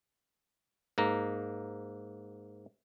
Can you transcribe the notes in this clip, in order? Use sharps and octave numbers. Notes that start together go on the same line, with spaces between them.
G#2 A#3 A#5